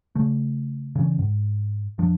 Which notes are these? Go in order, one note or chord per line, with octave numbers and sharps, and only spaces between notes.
C#3 A3
C#3 E3 C#4
G#2
F2 F3 D4